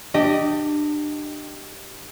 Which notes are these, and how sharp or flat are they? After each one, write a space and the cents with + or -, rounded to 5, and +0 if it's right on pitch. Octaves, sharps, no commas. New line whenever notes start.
D4 +25 G4 -10 D#5 +0